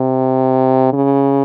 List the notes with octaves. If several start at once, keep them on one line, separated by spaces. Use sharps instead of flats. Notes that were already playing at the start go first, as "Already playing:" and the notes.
Already playing: C3
C#3